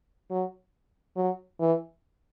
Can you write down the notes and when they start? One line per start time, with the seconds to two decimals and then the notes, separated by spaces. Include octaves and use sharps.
0.31 F#3
1.16 F#3
1.60 E3